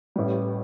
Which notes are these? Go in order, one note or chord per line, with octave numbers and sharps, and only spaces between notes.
A1 A2 E3 G3